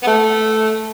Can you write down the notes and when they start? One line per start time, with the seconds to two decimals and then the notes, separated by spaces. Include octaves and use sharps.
0.03 B3
0.07 A3